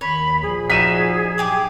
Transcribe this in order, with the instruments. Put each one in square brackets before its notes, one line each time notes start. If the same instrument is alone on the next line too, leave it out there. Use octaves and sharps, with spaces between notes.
[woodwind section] D#2 D#3 [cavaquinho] C#5 [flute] B5
[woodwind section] A#2 F3 [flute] G#4
[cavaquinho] D#4 F#4 E5 [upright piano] B6 D#7 E7
[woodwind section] G2 B2 F#3 [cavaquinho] G4 G#5 D6